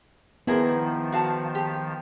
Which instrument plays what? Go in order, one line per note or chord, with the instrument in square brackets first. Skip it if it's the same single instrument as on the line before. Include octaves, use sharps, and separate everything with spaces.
[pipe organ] D#3 F3 [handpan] B3 [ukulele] E4 G#4 A#4
[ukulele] F#4 F5 A5
G4